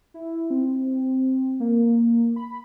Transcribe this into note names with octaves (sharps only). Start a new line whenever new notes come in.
E4
C4
A#3
B5